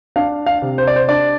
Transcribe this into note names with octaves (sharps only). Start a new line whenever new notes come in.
D4 F5
F5
C3
C5
D5
C5
D4 D5